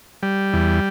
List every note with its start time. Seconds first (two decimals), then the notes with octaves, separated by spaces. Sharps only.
0.23 G3
0.53 E2